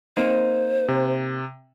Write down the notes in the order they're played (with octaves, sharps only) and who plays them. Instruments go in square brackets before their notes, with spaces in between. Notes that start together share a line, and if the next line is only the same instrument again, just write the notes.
[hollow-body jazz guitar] A#3 C4 D#4 [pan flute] C5
[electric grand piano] C3